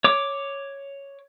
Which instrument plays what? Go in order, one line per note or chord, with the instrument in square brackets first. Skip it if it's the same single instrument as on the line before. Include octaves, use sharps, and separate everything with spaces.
[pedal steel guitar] C#5 D6